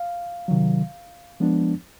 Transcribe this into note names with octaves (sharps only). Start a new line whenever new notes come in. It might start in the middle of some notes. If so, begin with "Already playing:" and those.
Already playing: F5
C3 D#3 F#3
F3 G#3 B3 D4